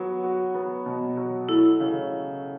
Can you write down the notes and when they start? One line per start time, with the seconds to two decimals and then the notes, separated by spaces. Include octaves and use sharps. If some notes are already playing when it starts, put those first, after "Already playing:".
Already playing: F#3 B3
0.24 F#4
0.54 B3
0.86 B2
1.17 F#3
1.48 A3 E4
1.80 C#3